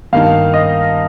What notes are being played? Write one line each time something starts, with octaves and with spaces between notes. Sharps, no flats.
G2 D#3 A#3 D#4 F5
D#5